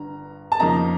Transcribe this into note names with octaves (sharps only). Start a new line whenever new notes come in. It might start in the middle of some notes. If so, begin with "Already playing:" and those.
Already playing: G1 G2 D3 A#5
A5
F2 C#3 F3 A#3 D#4 A#5